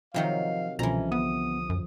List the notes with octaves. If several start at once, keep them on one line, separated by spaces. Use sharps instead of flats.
C3 D#3 F3 F#3 F5
C2 B2 D3 E3 F3 C#4 A#5
B3 D#6
F#2